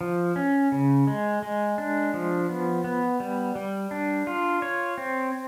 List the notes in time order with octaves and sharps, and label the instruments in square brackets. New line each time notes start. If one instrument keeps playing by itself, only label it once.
[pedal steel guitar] F3
C#4
C#3
G#3
G#3
D4
F3
B3
B3
G3
G3
D4
F4
C#5
C4